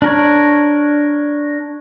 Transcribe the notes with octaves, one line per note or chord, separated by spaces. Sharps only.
D4 A#4 C#5